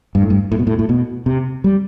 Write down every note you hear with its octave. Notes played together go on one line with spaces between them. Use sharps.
G2
A2
G2
A2
B2
A2
A2
B2
C3
G3